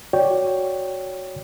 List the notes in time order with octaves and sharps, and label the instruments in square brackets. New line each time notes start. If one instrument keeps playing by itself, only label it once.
[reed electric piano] F#4 C#5 D5 G5